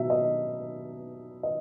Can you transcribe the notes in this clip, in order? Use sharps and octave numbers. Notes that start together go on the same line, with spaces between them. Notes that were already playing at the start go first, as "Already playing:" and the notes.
Already playing: B2 F#3 E5
D#5
D#5